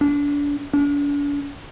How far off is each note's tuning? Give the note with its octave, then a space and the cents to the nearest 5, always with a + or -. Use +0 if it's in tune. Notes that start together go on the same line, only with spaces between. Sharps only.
D4 -30
D4 -40